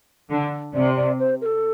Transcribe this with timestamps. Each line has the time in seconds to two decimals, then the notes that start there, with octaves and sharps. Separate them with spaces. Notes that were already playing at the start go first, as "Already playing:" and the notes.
0.29 D3
0.74 C3 D5
0.96 D5
1.19 C5
1.42 A#4
1.46 A4